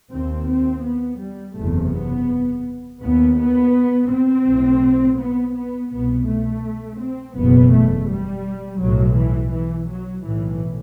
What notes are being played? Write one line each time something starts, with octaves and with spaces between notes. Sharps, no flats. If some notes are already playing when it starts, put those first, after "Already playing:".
D#2 C4
C4
B3
G3
F#1 E2 C3 A3
B3
D#2 B3
B3
C4
B1 A2
B3
B3
C2 B2 B3
A3
C4
F#1 E2 B2 B3
A3
G3
B1 A2 F#3
E3
E3
F#3
B1 A2 E3